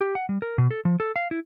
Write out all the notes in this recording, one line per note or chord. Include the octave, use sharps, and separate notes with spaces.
G4
F#5
G3
A#4
B2
A4
F3
A4
F5
E4